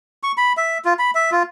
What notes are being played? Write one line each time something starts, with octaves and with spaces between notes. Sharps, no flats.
C#6
B5
E5
F4
B5
E5
F4